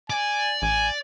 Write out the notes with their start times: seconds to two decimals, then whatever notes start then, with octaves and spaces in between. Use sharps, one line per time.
0.10 D5 G#5
0.62 A1 G#5